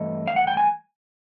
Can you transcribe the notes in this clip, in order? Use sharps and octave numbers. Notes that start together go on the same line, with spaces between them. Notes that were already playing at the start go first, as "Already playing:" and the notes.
Already playing: G2 E3 A3 D#5
F5
F#5
G5
G#5